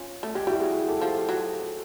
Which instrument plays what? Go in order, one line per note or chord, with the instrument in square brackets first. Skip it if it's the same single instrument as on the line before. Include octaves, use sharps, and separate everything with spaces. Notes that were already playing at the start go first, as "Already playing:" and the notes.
Already playing: [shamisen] C#4 [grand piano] F4
[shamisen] A3
[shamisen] G#3 [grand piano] G4
[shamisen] G3 [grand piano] E4 F#4
[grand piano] F#4 G#4
G4 A4
[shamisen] F3
F#3